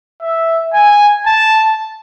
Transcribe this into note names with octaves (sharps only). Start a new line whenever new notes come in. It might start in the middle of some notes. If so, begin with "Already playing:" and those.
E5
G#5
A5